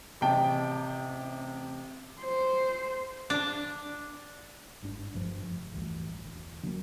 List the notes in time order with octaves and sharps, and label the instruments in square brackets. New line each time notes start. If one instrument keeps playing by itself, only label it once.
[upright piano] A1 C3 G5 A5
[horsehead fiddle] C5
[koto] D4
[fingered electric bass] G1 G#2 D4
D2 G2 F3
F1
A1 D2 G2 E3
E1
D3 F#3 G#3 A#3